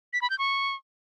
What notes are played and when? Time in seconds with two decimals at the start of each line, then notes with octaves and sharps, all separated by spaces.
0.13 B6
0.22 B5
0.30 G6
0.39 C#6